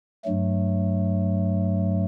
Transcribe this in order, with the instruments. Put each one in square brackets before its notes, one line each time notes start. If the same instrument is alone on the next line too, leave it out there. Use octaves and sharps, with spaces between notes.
[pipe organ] G2 F#3 A3